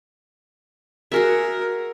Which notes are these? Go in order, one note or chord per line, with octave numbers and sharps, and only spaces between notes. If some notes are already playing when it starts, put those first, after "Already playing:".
F#4 G#4 A#4 E5